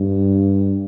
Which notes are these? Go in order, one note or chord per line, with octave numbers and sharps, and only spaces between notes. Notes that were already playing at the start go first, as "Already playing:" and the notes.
Already playing: G2